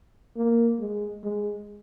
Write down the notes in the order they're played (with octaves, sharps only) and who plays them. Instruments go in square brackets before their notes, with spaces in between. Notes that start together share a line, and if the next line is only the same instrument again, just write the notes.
[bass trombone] A#3
G#3
G#3